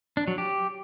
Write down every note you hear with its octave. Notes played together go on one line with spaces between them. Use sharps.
D4
F#3
G4